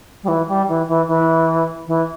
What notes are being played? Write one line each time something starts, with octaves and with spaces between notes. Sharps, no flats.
G3
E3
G3
E3
E3
E3
E3